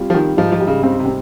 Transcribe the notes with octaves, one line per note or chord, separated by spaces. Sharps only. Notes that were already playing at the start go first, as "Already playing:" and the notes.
Already playing: G3 C4 F4
F3
D#3 G3
G#2 F3
F3
G3
C#3
C#3 C4
C3
C4